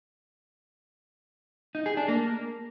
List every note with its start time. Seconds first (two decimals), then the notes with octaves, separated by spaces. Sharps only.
1.75 D#4
1.86 G#4
1.97 D4
2.08 A#3